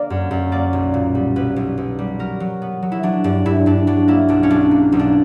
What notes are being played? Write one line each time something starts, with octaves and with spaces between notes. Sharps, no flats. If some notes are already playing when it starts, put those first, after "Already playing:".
Already playing: D3 A#3 D5
F#2
F#2
A#3 D5
B1
A#2
G3
B1 B4
B1
B1
G3
F#3 A#4
F#3
B3
F#3
E4
F#3 D4
G2 D4
G2 E4
G2 D4
F#3 D4
A#3 E4
B1 D4
C#4
B1 D4
A#3
B1
D4